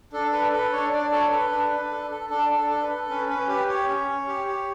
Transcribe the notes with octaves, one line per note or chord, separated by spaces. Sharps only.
D4 A4
A4 B4
A4 B4
D4 C#5
D4 D5
A4 C#5
A4 B4
D4 B4
D4
A4
A4
D4 A4
D4
A4
A4
B4
A4
C#4 B4
C#4 B4
G4 B4
G4 C#5
C#4
C#4
G4
G4